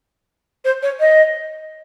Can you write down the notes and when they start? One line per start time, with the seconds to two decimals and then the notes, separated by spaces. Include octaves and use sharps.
0.65 C5
0.83 C#5
1.00 D#5